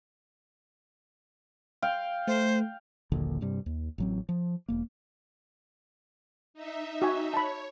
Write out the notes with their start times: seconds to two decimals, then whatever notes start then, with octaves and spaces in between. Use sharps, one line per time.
1.82 F5 G5
2.27 A3 C5
3.12 D#1 A#1 D#2 D3
3.41 G2 C3 G3
3.66 D#2
3.98 A1 F#3 C4
4.29 F3
4.68 E1 A#3
6.54 D#4 E5
7.02 F#4 G5 G#5
7.34 C#5 A5 B5